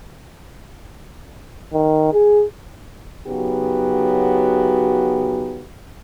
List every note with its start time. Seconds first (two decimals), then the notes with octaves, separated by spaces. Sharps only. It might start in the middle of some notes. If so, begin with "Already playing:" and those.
1.73 D#3
2.13 G#4
3.27 C#3 F#3 B3 D#4 F#4 G4